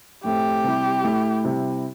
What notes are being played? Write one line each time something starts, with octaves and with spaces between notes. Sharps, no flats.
A2 A3 C4 G4
C3 G3 C4 E4
A2 A3 E4
C3 G3 E4